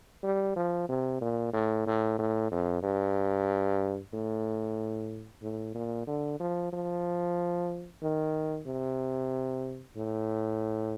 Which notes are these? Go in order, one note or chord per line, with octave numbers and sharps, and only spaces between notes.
G3
F3
C3
A#2
A2
A2
A2
F2
G2
A2
A2
A#2
D3
F3
F3
D#3
C3
A2